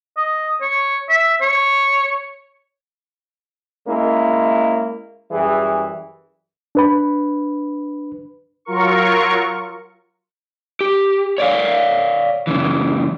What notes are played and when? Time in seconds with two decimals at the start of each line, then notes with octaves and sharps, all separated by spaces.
0.17 D#5
0.61 C#5
1.09 E5
1.41 C#5
3.87 G#3 A#3 C#4 E4
5.31 F#2 E3 G3 G#4
6.75 D4 B4 B5
8.65 F#3 F4 A#4 C#6
10.81 G4
11.38 C#5 D5 F5
12.47 F#2 C#3 E3